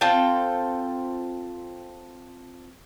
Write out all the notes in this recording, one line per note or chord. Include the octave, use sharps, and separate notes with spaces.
C4 F4 A4 G5